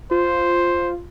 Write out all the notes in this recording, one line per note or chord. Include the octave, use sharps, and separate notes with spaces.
F4 C5